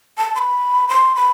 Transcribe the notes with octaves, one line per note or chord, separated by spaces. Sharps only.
A5
C6
B5
C6
B5